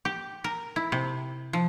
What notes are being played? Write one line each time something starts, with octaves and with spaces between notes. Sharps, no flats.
G4
A#4
E4
C3
F3